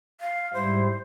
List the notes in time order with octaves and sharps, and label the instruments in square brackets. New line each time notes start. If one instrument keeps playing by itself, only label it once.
[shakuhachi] F5
[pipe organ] G#2 G3 E4 [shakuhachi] C5